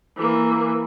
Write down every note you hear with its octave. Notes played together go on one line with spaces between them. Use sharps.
E3 A#3